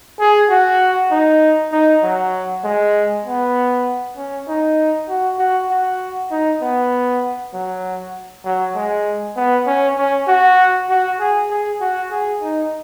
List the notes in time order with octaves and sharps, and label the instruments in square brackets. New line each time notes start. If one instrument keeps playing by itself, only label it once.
[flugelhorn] G#4
F#4
D#4
D#4
F#3
G#3
B3
C#4
D#4
F#4
F#4
F#4
D#4
B3
F#3
F#3
G#3
B3
C#4
C#4
F#4
F#4
G#4
G#4
F#4
G#4
D#4